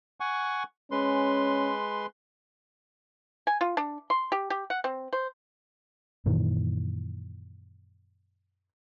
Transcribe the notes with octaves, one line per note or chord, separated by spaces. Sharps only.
F#5 G#5 C#6
G#3 C#4 B4 C6
G#5
F4
D4
C6
G4
G4
F#5
C4
C5
F#2 A#2 D#3 E3